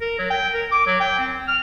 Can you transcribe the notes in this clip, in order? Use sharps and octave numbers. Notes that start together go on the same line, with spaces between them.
A#4
F#3
G5
A#4
D6
F#3
G5
C4
F6